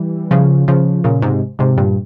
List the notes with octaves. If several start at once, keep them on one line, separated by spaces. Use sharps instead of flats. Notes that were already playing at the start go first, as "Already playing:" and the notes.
Already playing: E3 G3
C#3 F3
C#3 F3
A#2 C#3
G#2 C3
G#2 C3
G2 A#2